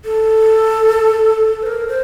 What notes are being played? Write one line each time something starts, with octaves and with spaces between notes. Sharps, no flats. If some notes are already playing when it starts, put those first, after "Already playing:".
A4
C5
A#4
C5